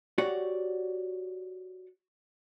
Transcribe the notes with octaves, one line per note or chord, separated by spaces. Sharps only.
F#4 G4 C#5 D5 F#5